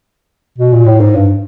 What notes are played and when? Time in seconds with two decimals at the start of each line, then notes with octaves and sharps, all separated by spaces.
0.58 B2
0.73 A#2
0.87 A2
1.00 G#2
1.15 G2